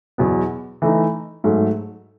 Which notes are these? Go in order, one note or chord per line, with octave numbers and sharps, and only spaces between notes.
E2 B2 F#3 B3
E3 A3 D#4
G#2 F#3 A3